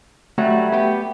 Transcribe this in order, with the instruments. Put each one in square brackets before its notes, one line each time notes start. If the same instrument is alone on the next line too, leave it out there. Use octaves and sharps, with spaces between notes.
[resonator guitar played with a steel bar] F#3 G3 F#5 [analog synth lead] A3
[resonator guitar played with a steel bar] B3 G4